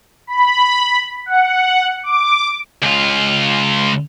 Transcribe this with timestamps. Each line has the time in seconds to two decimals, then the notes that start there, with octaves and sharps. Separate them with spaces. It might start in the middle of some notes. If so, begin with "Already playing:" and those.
0.27 B5
1.26 F#5
2.03 D6
2.83 C#2 F4